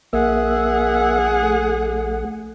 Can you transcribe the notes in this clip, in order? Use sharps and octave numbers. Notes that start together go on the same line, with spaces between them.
A#1 A#3 G#4 E5 F#5
A3